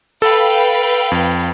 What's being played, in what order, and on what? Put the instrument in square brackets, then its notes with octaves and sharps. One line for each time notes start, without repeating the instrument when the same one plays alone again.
[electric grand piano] A4 [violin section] B4 F5 G5
[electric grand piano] F2